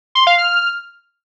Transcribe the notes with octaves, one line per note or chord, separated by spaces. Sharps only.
C6
F5
F6